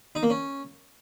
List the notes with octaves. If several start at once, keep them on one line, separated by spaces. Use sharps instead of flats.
D#4
A#3
C#4